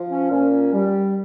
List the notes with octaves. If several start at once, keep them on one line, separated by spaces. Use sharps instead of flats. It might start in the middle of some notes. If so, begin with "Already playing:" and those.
Already playing: F3
C#4
A#2 C#4
G3